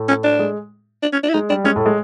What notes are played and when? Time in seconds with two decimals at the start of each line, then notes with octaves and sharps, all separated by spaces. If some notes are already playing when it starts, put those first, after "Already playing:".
Already playing: A2 A3
0.08 C#4
0.24 D4
0.39 G#3
1.02 D4
1.13 C#4
1.23 D4
1.29 E4
1.34 G#3 D#4
1.49 G3 D4
1.64 G#3 C#4
1.76 A2 A3
1.86 G#3